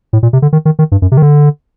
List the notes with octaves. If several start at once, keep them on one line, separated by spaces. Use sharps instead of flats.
A2
A#2
C3
D3
D#3
D#3
D#3
G2
F#2
C3
D#3
D3